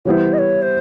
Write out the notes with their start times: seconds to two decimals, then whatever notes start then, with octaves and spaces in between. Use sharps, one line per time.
0.05 E3 G3 B3 E4 C5 C#5
0.33 D#5
0.38 C#5
0.62 C5